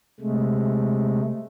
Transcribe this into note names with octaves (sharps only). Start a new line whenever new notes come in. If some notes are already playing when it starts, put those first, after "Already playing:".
C3 G#3 A3